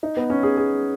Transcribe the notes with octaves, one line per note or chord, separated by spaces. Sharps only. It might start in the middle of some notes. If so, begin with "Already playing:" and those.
D#4
B3
C#4
G#4
G#4